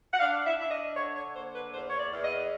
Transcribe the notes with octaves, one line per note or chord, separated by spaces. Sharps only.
F#5
D4 F5
E5
D4 E5
D#5
D3 C#5
C#5
A#3 C5
B4
E2 C5
C#5
D5
E2
D#5